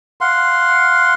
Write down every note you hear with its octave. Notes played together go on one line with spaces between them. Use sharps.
F5 F#5 C6